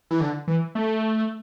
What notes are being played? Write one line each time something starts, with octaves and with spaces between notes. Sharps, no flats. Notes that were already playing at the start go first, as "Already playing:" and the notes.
E3
D3
E3
A3